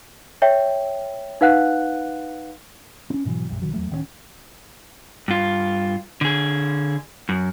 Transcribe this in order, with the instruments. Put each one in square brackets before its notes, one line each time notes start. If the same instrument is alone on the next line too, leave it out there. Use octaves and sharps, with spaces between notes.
[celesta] C#5 E5 G5
D#4 B4 F5 F#5 F#6
[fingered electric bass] C4 C#4
G#2 B2 E3 F#3
A#1 F#2 G3
B1 D#3 F#3
E2 F#3 A3
D1 D#3 A3 C#4
[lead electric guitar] G2 F4
D3 G#4
F#2